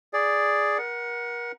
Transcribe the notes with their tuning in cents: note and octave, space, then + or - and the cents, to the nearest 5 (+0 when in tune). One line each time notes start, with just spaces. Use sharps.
G#4 +0 D5 +0
A#4 +35 F#5 +0